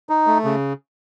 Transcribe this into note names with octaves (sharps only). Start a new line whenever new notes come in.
D#4
A3
C#3